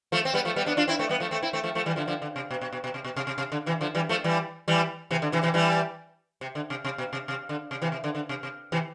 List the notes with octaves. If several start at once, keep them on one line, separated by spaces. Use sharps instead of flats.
F3 A3
C4
G3 B3
F3 A3
G3 B3
B3 D4
D4 F4
C4 E4
A3 C4
G3 B3
F3 A3
A3 C4
C4 E4
A3 C4
F3 A3
F3 A3
E3 G3
D3 F3
D3 F3
D3
C3
B2
B2
B2
B2
C3
B2
C3
C3
C3
D3
C3 E3
D3 F3
E3 G3
F3 A3
E3 G3
E3 G3
C3 E3
D3
C3 E3
C3 E3
E3 G3
C3
D3
C3
C3
B2
C3
C3
D3
C3
C3 E3
C3
D3
D3
C3
C3
C3 E3